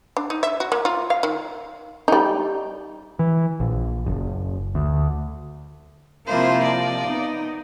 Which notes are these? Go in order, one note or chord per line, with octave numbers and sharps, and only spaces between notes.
D4
D#4
E5
F#4
A#3
F4
F5
D#3
G3 D#4
E3
A#1
F#1
D2
C3 F3 A#3 E4 F4 C5 F5
D5 D#5
B3 D#4